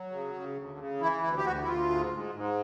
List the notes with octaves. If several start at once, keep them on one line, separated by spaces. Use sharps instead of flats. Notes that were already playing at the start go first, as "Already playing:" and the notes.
Already playing: F#3
C#3
C#3
D2
C#3
E3 E4
D2 E4
G4
D2 F#4
E4
D2 F4
G#2
G#2
G#2